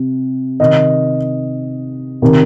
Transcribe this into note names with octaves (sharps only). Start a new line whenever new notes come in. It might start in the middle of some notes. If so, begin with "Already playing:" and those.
Already playing: C3
C3 D#3 D#5
C3 D#3